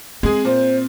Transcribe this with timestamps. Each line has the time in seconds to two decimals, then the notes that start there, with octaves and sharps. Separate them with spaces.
0.23 G#3 C4 G#4
0.45 A#2 C5